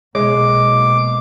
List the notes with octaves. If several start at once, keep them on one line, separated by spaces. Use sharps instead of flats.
B1 A#2 G#3 D6